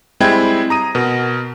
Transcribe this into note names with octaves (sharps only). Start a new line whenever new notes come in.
G3 G#3 C4 E4 G5 G#6
A#5 D#6 D#7
B2 A#4